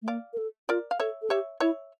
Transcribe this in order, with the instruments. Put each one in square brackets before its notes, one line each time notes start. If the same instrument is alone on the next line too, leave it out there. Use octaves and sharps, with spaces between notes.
[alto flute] A3
[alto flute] A#3 [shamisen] D5 F5
[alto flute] A#4
A4
[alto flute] F4 [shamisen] A#4 D5
[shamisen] F5
[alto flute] A4 [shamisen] C#5 E5
[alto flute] A4
[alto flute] G4 [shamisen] C#5 E5
[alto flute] E4 [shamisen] C#5 E5